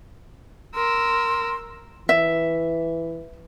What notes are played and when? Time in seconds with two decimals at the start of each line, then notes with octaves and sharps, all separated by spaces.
0.75 A#4 C6 E6
2.09 E3 E5